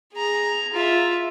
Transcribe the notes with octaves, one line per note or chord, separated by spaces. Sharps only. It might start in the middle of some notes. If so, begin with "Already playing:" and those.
G#4 A#5
F4 E5